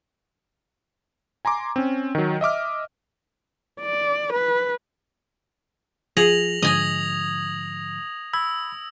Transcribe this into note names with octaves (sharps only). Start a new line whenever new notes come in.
G#5 A#5 C6 D6
C4 C#4
D#3 F#3
D#5 E5 D6 F6
D5
B4
F3 F4 G#4 A#6 F7 F#7
G#2 D3 F3 D#5 G#5 D#6 G#6 A#6
B5 E6 G#6